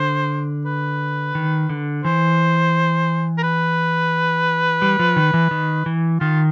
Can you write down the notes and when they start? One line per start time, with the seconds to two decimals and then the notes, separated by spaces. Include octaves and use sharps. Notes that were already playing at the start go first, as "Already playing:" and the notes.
Already playing: D3 C5
0.66 B4
1.35 D#3
1.69 D3
2.04 E3 C5
3.38 A#4
3.43 B4
4.82 G3
4.99 F3
5.16 D#3
5.34 E3
5.51 D#3
5.86 E3
6.20 D#3 F4